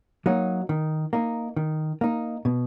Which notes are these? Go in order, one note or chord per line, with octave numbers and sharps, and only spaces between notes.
F#3 A#3 D#4
D#3
A#3 D#4
D#3
A#3 D#4
B2